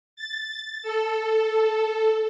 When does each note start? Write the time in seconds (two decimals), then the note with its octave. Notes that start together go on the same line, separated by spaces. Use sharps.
0.16 A6
0.83 A4